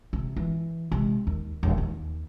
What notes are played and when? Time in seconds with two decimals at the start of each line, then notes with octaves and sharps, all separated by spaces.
0.13 C3
0.37 E3
0.92 C3 G#3
1.27 D#2
1.63 D#1
1.78 D#2